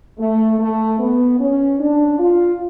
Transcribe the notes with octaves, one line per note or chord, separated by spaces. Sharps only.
A3
A3
B3
C#4
D4
F4